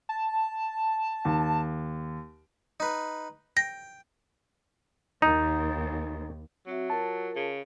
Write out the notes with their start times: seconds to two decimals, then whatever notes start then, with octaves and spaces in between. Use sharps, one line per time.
0.09 A5
1.25 D#2
2.80 D#4 B4
3.57 G5 A#6
5.22 D#2 D#4
6.67 F#3 C4 F#4 E5
6.90 F4 A#4 A5
7.36 C#3